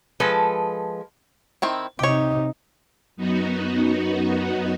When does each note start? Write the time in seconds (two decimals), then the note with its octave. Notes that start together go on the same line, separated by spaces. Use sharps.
0.20 F3 G#3 A4 B4
1.62 D#3 C4 E4
1.99 C3 D#4 G4 C#5
3.16 F#2 B3 D#4 F#4